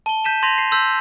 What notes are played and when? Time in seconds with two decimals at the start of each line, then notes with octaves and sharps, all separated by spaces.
0.06 A5 G7
0.24 G6 B6 D#7 E7
0.43 C6 G#6 A#6 B6 D#7 F7
0.58 C7
0.71 C6 E6 G6 B6